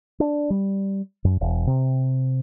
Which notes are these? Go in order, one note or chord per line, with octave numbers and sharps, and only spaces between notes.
D4
G3
F#2
E1
C3